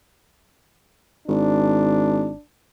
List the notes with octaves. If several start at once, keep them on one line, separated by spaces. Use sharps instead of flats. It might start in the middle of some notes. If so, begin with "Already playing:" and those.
G#1 D4